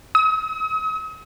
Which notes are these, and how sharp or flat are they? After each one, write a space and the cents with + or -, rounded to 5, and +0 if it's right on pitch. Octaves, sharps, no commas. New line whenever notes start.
D#6 +45